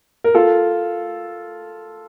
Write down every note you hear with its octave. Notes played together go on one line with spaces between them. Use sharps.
A#4
F4 A4